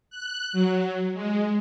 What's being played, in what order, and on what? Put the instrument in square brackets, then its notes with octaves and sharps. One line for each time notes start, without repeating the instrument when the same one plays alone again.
[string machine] F#6
F#3
G#3